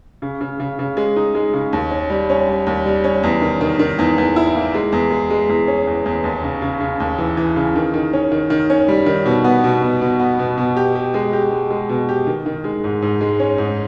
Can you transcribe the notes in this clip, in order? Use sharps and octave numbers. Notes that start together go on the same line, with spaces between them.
C#3
C#3
C#3
C#3
G#3
D#4
G#3
C#3
D#2
C#4
G3
C#4
G3
D#2
G3
C#4
E2
D#3
D#3
D#3
E2
E2
E4
A#3
G#3
E2
G#3
G#3
E2
C#4
E2
E2
D#2
C#3
C#3
C#3
D#2
E3
E3
C#3
D#3
D#3
C#4
D#3
D#3
C#4
G3
D#3
B2
B3
B2
B2
B2
B3
B2
B2
G4
G4
G#3
G4
G#3
G#3
B2
G4
D#3
D#3
G#3
G#2
G#2
G#3
C#4
G#2